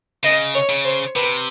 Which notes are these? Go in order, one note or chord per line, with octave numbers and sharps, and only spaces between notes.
C#3 D#5
C#5
C#3
C5
C3 B4